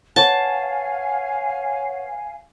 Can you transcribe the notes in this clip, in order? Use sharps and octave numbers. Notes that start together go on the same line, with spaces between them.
B4 C#5 F5 F#5 G#5 A5